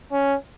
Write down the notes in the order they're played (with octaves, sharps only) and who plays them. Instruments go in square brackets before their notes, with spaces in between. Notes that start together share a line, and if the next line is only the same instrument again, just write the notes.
[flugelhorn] C#4